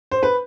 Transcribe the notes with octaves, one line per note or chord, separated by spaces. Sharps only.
C5
B4